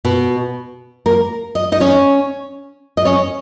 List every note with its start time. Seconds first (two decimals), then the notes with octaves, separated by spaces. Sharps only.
0.05 B2 B3
1.06 A#3 A#4
1.55 D#5
1.72 D#4 D#5
1.80 C#4 C#5
2.97 D#5
3.05 C#4 C#5